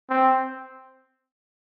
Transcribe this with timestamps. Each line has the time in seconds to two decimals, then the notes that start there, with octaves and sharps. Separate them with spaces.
0.10 C4